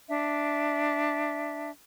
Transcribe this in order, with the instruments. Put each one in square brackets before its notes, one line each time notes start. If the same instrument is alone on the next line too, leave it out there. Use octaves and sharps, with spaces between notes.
[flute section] D4 E5